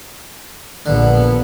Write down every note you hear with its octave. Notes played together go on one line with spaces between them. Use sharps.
A#1 D3 B3